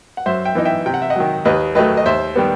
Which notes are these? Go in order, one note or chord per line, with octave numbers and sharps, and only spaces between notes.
F#5
F#2 C5 E5
E5 G5
E3 B3 D#4
E5 G5
C3 G5
F#5
E5
D#5 F#5
D#3 F#3
D#2 B4 D#5
D#3 F#3 A3 B4 D#5
D#5
D#2 C5 E5
D#3 G3 B3